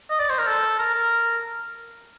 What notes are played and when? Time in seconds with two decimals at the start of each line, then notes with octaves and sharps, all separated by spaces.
0.10 D#5
0.19 D5
0.29 C5
0.39 A#4
0.48 A4
0.79 A#4
0.94 A#4